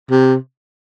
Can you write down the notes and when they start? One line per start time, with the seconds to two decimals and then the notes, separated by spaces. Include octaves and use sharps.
0.10 C3